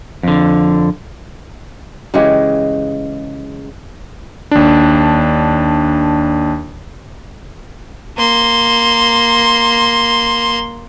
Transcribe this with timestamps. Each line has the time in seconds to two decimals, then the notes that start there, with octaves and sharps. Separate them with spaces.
0.23 F2 D3
2.14 C#3 E3 G#3 G4
4.51 D#2 D4
8.18 A#3 C6